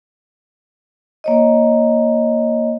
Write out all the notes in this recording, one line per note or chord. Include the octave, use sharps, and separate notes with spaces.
A#3 C#5 D#5